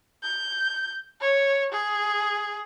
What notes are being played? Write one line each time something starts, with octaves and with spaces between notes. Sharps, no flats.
G6
C#5
G#4